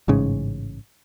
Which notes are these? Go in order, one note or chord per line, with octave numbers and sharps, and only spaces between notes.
A1 G#2 C#3